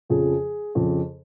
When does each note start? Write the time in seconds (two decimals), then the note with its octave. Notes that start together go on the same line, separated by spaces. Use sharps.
0.09 F2 C#3 F3 G#4
0.75 F2 C#3 F3